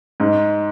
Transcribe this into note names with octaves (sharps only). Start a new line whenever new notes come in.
G#2